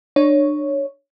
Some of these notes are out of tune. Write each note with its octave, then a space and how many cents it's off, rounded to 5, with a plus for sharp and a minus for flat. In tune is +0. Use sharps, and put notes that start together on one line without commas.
D4 +25 C#5 +0